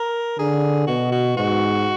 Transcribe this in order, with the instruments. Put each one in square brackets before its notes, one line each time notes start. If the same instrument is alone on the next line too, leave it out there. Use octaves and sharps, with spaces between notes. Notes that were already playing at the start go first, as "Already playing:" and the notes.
Already playing: [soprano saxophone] A#4
[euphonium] D3 [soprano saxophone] G#4
[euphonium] B2 [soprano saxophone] F#4
[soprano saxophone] F#4
[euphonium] G#2 [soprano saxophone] F#4